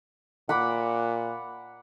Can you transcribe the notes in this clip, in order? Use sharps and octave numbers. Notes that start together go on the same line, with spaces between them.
A#2 F#5 B5 D6